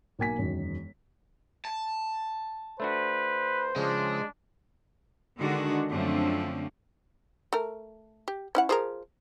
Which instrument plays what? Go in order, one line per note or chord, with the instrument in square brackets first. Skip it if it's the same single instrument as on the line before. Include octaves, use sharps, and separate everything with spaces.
[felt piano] B1 A#3 G#5 B6
E1 F#2 D#3
[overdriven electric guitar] A5
[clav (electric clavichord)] A3 D4 F#4 [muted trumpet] B4 [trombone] C5
[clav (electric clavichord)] C#3 F3 [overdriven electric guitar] G#3 [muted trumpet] D4
[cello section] D3 D#3 G#3 D4 F#4
F#2 D3 F3 A3 C4
[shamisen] A3 A#4
G4
C#4 E4 F#5
F3 G#4 A#4